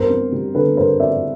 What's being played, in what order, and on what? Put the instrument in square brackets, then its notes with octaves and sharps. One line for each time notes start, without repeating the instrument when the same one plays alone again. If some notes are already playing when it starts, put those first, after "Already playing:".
Already playing: [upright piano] G2 B3 A#4 C5
C4
G3
D3 A4 B4
G2 A#4 C5
C4 D5 E5